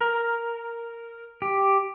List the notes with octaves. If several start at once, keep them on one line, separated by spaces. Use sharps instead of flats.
A#4
G4